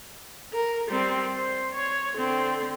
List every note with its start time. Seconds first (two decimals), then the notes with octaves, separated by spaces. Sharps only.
0.54 A#4
0.88 G3 C4
1.35 C5
1.74 C#5
2.15 D3 C4